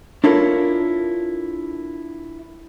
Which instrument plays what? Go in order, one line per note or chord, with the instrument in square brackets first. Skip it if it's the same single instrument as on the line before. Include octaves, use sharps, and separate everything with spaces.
[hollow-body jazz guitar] D4 E4 F4 A4 A#4 C#5